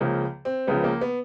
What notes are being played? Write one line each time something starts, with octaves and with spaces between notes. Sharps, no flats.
C#2 C#3 F3 A#3
C4
C#2 C#3 F3 B3
A#3
B3